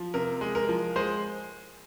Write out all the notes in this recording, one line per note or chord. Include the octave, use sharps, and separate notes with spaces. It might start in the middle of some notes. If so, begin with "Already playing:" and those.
Already playing: F3
C3 A#4
G#3
A#4
F3
G#3 C5